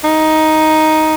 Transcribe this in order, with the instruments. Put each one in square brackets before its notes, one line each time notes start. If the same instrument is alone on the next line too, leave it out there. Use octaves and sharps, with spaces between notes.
[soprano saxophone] D#4